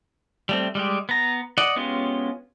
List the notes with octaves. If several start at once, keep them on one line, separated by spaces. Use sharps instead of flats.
G3 A3 C4
G3 G#3 G4
B3 A#5
D5 D#5 F#5
G#3 B3 C#4 F4 G4